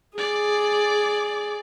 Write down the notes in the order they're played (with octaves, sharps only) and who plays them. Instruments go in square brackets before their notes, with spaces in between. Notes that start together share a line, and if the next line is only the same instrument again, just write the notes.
[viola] G#4 [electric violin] D5